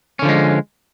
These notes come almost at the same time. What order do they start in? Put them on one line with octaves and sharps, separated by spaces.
C#4 D3 F3 G#3